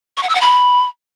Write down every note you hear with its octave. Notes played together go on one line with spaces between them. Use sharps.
C#6
F#5
E6
F#5
B5